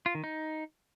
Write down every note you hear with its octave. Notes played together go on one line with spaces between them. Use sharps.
F4
D#3
D#4